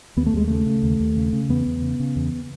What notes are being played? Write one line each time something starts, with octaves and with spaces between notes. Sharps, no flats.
D#2 B3
A3
D#2 G#3
C#3 A3
C#3
D#2
D#2
C#3
C#3
E2 B3
E2
C#3
C#3
E2